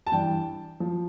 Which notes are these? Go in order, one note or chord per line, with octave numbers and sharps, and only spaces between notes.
A5
G2 E3 G5
F3